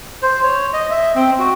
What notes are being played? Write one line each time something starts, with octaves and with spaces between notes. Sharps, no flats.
C5
C#5
D#5
E5
C4
F#4